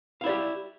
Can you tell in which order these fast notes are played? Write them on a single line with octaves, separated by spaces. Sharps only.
F5 E4 D5 G4